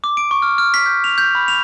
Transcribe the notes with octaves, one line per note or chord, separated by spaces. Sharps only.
D6
D7
C#6
F6
F6
B6
G6
F7
G6
B5
F7